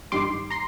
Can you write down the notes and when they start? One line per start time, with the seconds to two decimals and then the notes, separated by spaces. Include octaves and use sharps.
0.12 G2 D#3 G3 C6 D6
0.50 A#5 C6